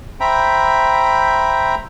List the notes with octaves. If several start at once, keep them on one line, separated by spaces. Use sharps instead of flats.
C5 E5 G5 A#5 B5